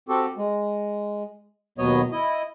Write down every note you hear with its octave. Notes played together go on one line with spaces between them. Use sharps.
C4 F#4 G4 A4
G#3
D#2 B2 F#3 B3 C#5 D#5
E4 D#5